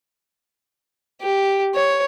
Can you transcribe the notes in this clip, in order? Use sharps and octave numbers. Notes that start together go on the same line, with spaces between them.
G4
C#5